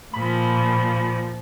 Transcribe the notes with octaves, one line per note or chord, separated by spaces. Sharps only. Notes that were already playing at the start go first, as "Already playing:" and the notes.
A#2 F3 B5